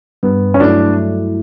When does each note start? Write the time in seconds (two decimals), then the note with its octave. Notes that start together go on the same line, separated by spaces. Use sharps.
0.23 G2 B3
0.54 C#4
0.60 F#3 A3 D4 E4